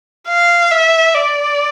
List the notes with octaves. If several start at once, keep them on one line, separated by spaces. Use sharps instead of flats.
F5
E5
D5